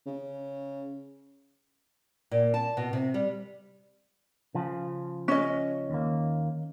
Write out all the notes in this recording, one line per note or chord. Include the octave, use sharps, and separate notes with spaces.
C#3
A#2
A5
B2
C3
G3
C#3 F3
C#4 D#5
D#2 A#3